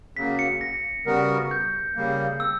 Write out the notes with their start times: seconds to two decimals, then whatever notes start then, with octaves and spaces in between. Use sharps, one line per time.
0.16 C#3 F#3 A#3 B6
0.39 C#7
0.61 A#6
1.06 C#3 G3 B3 F#4 A#4
1.51 G6
1.96 C#3 G3 A#3
2.40 E6